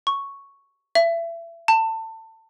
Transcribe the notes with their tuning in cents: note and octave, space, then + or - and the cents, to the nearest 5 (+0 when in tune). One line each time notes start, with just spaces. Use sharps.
C#6 +0
E5 +30
A5 +25